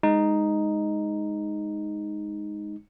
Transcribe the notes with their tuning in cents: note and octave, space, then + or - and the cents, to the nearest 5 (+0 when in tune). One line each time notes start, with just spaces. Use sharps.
G#3 +0 D#4 +0